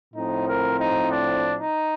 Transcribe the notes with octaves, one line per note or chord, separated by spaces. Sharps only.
A2 F3 C4 D#4
A#4
D#4
D4
D#4